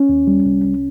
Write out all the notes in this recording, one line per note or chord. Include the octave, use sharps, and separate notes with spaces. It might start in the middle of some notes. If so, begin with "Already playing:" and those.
Already playing: C#4
D#2
G3
C2
C2